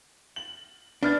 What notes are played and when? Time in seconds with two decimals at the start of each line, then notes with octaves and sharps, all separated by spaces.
0.36 F#7
1.03 B3 D4 F6 A6